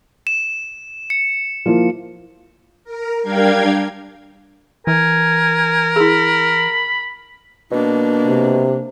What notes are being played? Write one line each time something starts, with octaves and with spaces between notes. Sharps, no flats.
E7
C#7
F3 A#3 E4
A#4
G3 D4 A#4 F5 G5 G#6
E3 A#4 G#5
E4 G#4 B5
B2 A#3 D4
C3